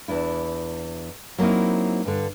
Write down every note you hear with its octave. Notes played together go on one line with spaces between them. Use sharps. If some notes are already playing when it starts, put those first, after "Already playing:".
E2 D4 E4
F#3 A#3 C4 D#4 E4
G2 D3